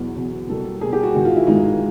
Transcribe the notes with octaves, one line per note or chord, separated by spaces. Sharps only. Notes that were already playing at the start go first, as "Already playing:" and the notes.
Already playing: E2 B2 F#3
E2 B2 F#3
B2 G3 A#3 A4
B2 G3 A#3 G#4
G4
F#4
G#2 D#3 G#3 F#4
F4
E4
G#2 D#3 G#3 D#4